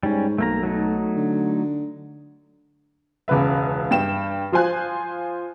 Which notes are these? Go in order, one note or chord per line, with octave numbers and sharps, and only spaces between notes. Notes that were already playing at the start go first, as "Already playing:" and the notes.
G#2 G3 C#4
B1 A3 A#3 A#5
F#3 A3 D#4
D3
E1 C#2 C#3 B4 E5
G2 G5 E7
F3 F4 C5 G#5 F#6